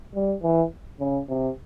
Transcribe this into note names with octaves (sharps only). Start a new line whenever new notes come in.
G3
E3
C#3
C3